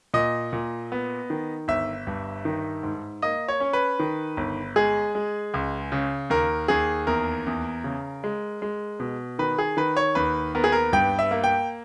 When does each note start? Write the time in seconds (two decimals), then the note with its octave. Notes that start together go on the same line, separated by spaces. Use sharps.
0.14 A#2 D#5
0.53 A#2
0.92 B3
1.30 D#3
1.68 G1 E5
2.07 G2
2.45 D#3
2.83 G#2
3.22 A#3 D#5
3.48 C#5
3.60 C#4
3.73 B4
3.99 D#3
4.37 G1
4.76 G#3 G#4
5.15 G#3
5.54 C#2
5.92 C#3
6.30 D#2 A#4
6.68 D#2 G#4
7.07 E2 A#4
7.47 E2
7.84 C#3
8.24 G#3
8.62 G#3
9.00 B2
9.39 D#3 B4
9.58 G#4
9.77 D#3 B4
9.97 C#5
10.15 D#2 B4
10.55 B3 A#4
10.64 G#4
10.72 A#4
10.93 G2 G5
11.19 E5
11.31 A#3
11.44 G5